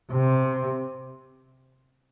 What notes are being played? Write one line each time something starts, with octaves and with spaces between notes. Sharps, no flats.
C3